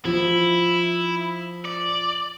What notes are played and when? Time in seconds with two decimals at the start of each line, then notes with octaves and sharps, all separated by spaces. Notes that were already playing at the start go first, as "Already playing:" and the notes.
0.05 F3 E4
1.65 D5